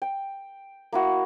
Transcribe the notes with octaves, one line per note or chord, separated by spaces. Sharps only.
G5
A#3 E4 F#4